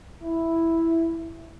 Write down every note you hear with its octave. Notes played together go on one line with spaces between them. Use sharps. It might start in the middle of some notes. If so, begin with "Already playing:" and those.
E4